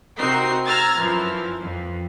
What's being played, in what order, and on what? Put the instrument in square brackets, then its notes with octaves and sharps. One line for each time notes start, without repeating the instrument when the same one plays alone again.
[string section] C3 C4 D#4 F#4 A#4 C7
A#5 E6 F6 G#6 A6
F#2 E3 F3
F2